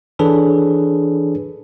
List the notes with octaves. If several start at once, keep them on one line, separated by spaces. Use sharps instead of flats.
E3 D4 G#4 A4 B4 C#5